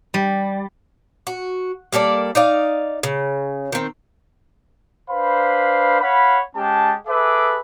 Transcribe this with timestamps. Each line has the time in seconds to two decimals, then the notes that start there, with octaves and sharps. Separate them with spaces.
0.14 G3
1.27 F#4
1.93 G3 A#3 A4 D5
2.35 D#4 D5 F5
3.03 C#3
3.72 D#3 C4
5.10 D4 B4 C5 F5 B5
6.01 C#5 F5 F#5 B5
6.55 G#3 C#4 G4 A5
7.07 G#4 A4 B4 E5 D6